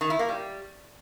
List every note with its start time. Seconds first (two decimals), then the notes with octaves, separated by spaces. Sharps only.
0.01 D#3
0.10 E4
0.19 A#3
0.29 G3